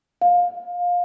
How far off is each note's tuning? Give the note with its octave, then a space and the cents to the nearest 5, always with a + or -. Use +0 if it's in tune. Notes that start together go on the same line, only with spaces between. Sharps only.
F5 +20